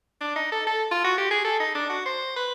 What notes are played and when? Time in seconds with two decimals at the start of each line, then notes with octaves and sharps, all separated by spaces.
0.21 D4
0.36 D#4
0.52 A4
0.67 A4
0.91 F4
1.05 F#4
1.18 G4
1.31 G#4
1.44 A4
1.60 D#4
1.75 D4
1.90 F#4
2.06 C5
2.36 B4